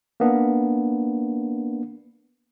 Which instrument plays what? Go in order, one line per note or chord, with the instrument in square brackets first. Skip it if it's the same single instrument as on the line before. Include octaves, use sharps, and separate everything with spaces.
[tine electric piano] A#3 B3 D4